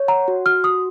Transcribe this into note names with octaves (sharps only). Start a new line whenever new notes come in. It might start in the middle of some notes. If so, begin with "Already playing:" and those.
Already playing: C#5
F#5 A#5
F#4
F#4 F6
F#4 D#6